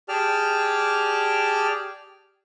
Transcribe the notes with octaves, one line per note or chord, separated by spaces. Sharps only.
G4 G#4 D5 A5 F6